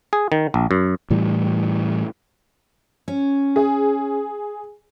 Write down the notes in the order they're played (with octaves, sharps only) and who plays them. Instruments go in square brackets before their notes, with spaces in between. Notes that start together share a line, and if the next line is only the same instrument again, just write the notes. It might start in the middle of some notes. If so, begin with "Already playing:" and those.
[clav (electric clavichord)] G#4
D#3
A#1
F#2
[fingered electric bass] A2 E3 G3
[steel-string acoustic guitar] C#4
[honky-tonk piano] G#4